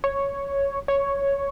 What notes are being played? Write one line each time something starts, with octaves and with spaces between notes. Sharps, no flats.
C#5
C#5